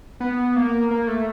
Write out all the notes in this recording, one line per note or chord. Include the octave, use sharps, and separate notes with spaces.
B3
A#3
A#3
A3